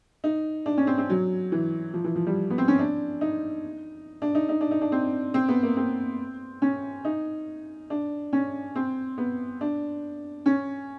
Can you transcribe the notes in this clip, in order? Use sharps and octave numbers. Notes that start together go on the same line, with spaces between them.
D#4
D4
C#4
C4
C4
F#3
E3
F3
E3
F3
G3
B3
C4
C#4
D4
D#4
D4
D#4
D#4
D4
D#4
D4
C4
C4
B3
A#3
C4
C#4
D#4
D4
C#4
C4
B3
D4
C#4